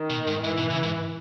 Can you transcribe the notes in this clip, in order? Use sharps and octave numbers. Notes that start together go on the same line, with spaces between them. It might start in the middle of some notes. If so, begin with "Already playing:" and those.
Already playing: D#3
B2
G#2
G#2 E3
B2
C#3
G#2